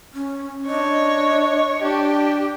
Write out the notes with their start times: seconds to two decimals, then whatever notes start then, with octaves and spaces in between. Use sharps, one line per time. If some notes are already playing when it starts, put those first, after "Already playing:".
0.14 C#4
0.67 D4 C#5 D#5
1.83 D4 G4